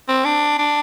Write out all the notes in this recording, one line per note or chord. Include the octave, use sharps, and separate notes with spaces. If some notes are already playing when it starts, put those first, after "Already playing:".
C4
D4
D4